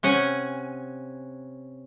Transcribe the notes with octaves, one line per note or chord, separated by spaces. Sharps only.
C3 C#4 F#5 G#5